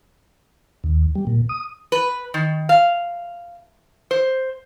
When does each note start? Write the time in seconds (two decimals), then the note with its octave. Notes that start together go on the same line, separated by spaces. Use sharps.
0.84 D#2
1.15 G3
1.27 A#2
1.49 D#6
1.92 B4
2.34 D#3
2.69 F5
4.11 C5